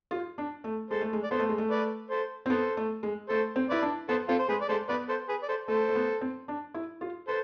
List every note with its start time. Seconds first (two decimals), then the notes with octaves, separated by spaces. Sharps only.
0.11 F4
0.38 D4
0.64 A3
0.91 G#3 A4 C5
1.01 A3
1.13 G#3
1.24 D5
1.31 B3 A4 C5
1.39 A3
1.49 G#3
1.58 A3
1.71 B4 D5
2.10 A4 C5
2.46 C4
2.50 B3 A4 C5
2.77 A3
3.03 G#3
3.29 A3 A4 C5
3.56 C4
3.70 E4 B4 D5
3.82 D4
4.09 B3 A4 C5
4.29 C4 F4 A4
4.39 C5
4.49 G#3 G#4 B4
4.61 D5
4.69 G#3 A4 C5
4.89 B3 B4 D5
5.09 A4 C5
5.29 G#4 B4
5.43 D5
5.49 A4 C5
5.68 A3 A4 C5
5.89 A3
5.95 B3
6.21 C4
6.48 D4
6.74 E4
7.01 F4
7.28 A4 B4 C5